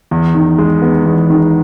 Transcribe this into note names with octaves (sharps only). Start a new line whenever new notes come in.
E2
D#3
G#3
B3
E2
D#3